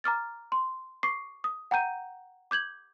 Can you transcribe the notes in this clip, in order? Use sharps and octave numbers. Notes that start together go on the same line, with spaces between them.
A#5 D6 F6 A6
C6
C#6 D6 C7
D#6
F#5 G5 A#5 G6 D#7
D6 G6 G#6 F#7